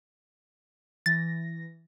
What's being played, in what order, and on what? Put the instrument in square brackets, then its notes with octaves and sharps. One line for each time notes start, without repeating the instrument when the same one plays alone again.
[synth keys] E3 A#6 [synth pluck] A6